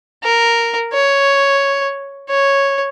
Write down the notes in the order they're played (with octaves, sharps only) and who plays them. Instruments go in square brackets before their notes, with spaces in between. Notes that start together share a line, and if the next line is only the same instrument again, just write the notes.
[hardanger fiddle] A#4
C#5
C#5